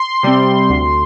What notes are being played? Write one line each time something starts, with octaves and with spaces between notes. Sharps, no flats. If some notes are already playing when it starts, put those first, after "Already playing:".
Already playing: C6
C3 G3 C4
D2